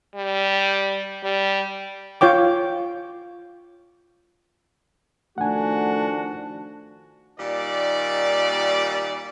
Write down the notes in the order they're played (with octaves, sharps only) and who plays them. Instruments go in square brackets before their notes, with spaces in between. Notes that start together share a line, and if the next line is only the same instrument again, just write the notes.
[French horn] G3
G3
[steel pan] F4 C#5 G5 D6
[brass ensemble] D#3 F3 F#4 [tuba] A3 [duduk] D4 [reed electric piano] F#5 G#5
[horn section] A#2 D#3 G3 D5